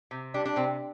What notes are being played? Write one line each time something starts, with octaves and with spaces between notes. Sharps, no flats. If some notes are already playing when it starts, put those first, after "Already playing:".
C3
G3 D4
D4
C3 C4